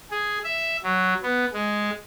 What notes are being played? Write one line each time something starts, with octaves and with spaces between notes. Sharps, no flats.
G#4
E5
F#3
B3
G#3